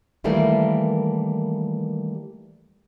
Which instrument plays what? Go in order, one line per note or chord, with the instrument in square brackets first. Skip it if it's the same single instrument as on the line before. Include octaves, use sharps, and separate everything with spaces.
[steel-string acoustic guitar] D#3 E3 G3 A3 A#3